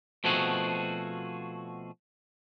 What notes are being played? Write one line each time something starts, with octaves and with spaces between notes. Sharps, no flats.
B2 F3 A3 C4 F#4 G#4